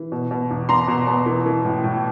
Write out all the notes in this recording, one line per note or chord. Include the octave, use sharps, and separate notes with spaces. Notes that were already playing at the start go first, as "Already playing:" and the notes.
Already playing: E3
B2
B2
E2
E2 A#5 C6
B2
B2
E3
E3
A2
A2